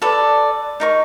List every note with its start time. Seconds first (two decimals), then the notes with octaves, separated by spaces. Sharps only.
0.02 A4 B4 D5
0.80 D#4 A#4 C#6